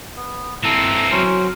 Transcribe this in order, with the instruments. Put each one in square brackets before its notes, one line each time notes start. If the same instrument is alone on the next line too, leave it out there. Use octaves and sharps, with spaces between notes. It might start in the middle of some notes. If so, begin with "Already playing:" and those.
[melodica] B3
[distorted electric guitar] E3 C4 [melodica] A4 A#5
[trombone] F#3 [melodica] C#4 A#4 C5